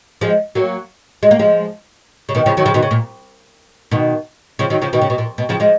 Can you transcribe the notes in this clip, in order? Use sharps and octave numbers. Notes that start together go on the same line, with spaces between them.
F3 G#3
F#3 A#3
G#3
A#3
F3 G#3
C#3
B2 D#3
C#3 F3
D#3 F#3
C#3 F3
B2 D#3
C#3
A#2
B2 D#3
C#3 F3
D#3 F#3
C#3 F3
B2 D#3
C#3
B2
A#2
B2
C#3 F3
F3 G#3